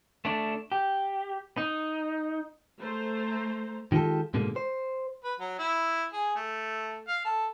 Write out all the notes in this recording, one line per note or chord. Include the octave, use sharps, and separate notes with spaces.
A3 D4
G4
D#4
A3 C5 A#5
D#3 G#3 F4 G4 A4
G#2 B2 D3 G#3 A#3
C5
B4
F#3
E4
G#4
A3
F5
A4